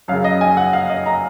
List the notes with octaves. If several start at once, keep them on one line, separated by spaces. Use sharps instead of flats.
F#2 C#3 F5
D#5
G#5
F#5
F5
D#5
A#5